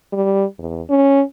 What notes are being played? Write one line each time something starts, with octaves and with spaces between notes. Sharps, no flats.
G3
E2
C#4